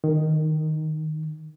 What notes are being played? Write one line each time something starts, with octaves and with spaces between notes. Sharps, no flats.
D#3